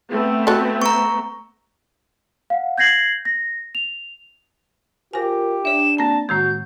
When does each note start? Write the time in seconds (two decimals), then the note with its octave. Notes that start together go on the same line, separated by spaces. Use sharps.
0.11 A3 B3 C4
0.47 F#4 A4
0.82 A#5 C#6
2.50 F5 F#5
2.78 G6 G#6 A#6 C7 F#7
3.25 A#6
3.75 F7
5.13 F4 G4 A#4 C5 G#5
5.65 D4 C#5 E5 E7
5.98 A#3 C4 A5 A#5
6.29 A2 D#3 G#3 F#4 G6